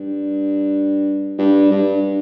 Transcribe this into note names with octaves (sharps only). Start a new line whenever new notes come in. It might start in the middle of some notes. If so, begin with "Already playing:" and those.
Already playing: G2
G2
G2